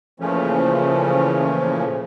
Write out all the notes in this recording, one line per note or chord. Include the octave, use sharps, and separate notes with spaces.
A#2 C#3 E3 F3 A3 C#4